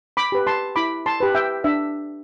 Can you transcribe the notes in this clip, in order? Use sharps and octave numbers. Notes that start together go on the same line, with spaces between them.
B5 D6
G4 B4
A5 C6
E4 B5 D6
A5 C6
G4 B4
E5 G5
D4 E5